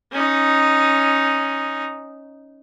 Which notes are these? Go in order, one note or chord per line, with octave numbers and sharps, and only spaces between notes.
C#4 D#4